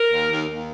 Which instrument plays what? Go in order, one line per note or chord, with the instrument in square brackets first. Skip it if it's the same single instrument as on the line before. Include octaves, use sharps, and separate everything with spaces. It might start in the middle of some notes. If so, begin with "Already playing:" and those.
Already playing: [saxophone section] A#4
D#2
D#2
D#2